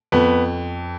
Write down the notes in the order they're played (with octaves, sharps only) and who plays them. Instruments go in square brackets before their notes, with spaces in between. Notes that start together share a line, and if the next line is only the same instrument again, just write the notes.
[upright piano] F2 [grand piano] B3